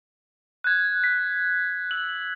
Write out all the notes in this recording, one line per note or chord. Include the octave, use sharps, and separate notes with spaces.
F#6 G#6
B6
E6 F#7